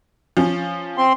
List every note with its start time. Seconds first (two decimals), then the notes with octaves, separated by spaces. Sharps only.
0.37 F3 C#4
0.97 C4 C6